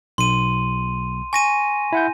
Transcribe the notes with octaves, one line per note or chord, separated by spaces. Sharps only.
B1 C6 D#7
G#5 C#6 A#6 D#7
E4 F#5 G6